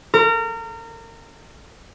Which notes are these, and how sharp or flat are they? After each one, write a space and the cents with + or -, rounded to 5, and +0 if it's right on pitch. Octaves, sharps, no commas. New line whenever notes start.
A#4 -30